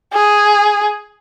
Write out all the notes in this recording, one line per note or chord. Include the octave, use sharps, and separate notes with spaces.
G#4